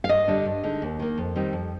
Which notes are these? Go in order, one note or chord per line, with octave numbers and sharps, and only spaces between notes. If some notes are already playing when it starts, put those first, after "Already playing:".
F5
G2 D#5
D3 G3 D4
G2
D3 G#3 D#4
D#2
D#3 A#3
F2
D#3 G3 C4 D#4
F2